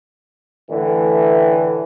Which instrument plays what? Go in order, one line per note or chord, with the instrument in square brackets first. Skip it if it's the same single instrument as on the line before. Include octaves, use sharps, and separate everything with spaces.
[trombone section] A2 D3 E3